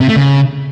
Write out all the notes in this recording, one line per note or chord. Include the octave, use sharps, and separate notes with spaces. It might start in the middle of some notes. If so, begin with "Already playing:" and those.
C3
A3
C#3